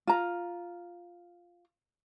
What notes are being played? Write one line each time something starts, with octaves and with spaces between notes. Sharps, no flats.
F4 A#5